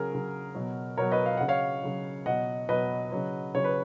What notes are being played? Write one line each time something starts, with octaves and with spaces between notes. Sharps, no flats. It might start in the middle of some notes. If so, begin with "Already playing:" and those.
Already playing: C#3 F#3 G#4 A#4
C#3 F#3
B2 F#3
B2 F#3 A#4 C#5
B4 D#5
F5
C#3 F#3 F#5
C#5 F5
C#3 F#3
B2 F#3 D#5 F#5
B2 F#3 B4 D#5
C#3 F#3
C#3 F#3 C#5
B4